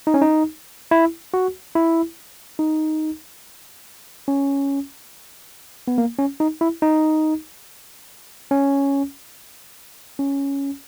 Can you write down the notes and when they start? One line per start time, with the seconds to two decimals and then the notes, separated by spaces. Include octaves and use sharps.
0.07 D#4
0.14 C#4
0.22 D#4
0.91 E4
1.34 F#4
1.76 E4
2.59 D#4
4.28 C#4
5.88 B3
5.98 A#3
6.18 C#4
6.40 D#4
6.61 E4
6.82 D#4
8.51 C#4
10.19 C#4